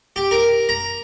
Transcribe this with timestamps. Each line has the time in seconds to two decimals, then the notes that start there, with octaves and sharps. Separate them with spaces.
0.16 G4
0.31 A#4
0.69 A#5